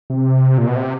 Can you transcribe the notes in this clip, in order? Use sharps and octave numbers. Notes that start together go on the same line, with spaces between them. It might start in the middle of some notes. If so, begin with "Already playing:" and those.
C3
A#2
B2
C3